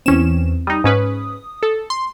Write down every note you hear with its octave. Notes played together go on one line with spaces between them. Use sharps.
E2 E3 C4 C#4 E7
G3 D#4 D#6
G#2 C#4 B4
A4
C6